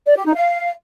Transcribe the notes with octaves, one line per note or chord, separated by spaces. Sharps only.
D5
G4
D#4
F5